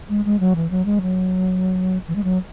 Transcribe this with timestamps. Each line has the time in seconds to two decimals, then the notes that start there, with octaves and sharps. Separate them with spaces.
0.09 G#3
0.25 G#3
0.40 F#3
0.56 E3
0.71 F#3
0.86 G#3
1.02 F#3
2.08 E3
2.16 G#3
2.24 F#3